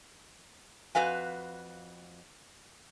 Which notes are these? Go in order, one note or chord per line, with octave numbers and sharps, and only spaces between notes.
F2 F#4 B4 F5 G#5